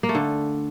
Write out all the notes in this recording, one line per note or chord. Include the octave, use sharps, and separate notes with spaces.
A#3
A3
D3